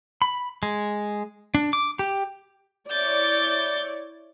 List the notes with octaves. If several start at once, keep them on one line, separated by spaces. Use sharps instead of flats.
B5
G#3
D4
D6
G4
E4 C#5 D5 G6 A6